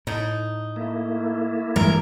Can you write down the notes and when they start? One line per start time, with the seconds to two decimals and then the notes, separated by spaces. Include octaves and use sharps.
0.07 A2 D#4
0.76 A3 A#3 E4
1.76 G2 E3 G#3 A#4